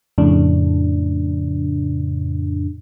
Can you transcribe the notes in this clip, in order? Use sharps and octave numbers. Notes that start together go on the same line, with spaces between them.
F2 A2 C#3 D4